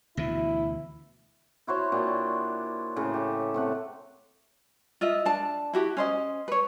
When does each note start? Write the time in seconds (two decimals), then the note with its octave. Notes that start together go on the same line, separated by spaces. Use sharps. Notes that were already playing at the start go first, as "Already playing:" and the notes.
0.17 D2 B2 E3 E4
1.67 E4 F#4 C5 C#5
1.92 A#2 D4 F#4 G5
2.96 A2 C#3 C#6
3.14 G4 A4
3.54 C3 A3 F#5
5.01 F4 D#5 E5
5.26 D4 A5
5.73 E4 F#4 G4
5.97 C#4 C5 D#5
6.48 B4 C#5